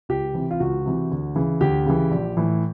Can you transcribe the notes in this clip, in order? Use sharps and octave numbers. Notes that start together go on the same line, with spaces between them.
C#2 G4
C3 E3
F4
C#2 F#4
C3 E3
D2
C#3 E3
D2 G4
C#3 E3
A#1
A2 E3